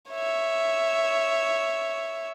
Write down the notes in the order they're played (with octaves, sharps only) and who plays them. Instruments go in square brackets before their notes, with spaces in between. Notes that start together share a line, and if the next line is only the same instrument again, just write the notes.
[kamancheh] C#5 E5